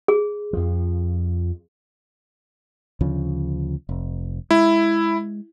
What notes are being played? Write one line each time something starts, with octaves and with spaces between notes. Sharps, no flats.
G#4
F2 F3
D2 C#3 F3
F1
G#3 E4